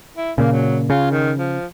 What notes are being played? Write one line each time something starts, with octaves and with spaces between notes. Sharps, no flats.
E4
A#2 C#3 A#3
F#3
C#3 F4
D#3
F3